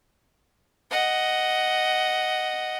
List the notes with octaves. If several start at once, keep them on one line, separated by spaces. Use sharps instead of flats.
D#5 F#5